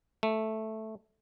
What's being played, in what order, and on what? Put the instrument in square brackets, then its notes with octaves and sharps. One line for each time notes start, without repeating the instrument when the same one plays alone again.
[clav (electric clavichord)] A3